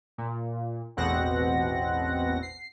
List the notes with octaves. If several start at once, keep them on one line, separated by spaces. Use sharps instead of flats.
A#2
A1 E2 B2 C4 F#5 A#6
C7